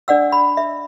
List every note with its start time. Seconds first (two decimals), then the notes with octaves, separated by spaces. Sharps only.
0.08 D4 D5 F#5 E6
0.32 B5
0.57 E5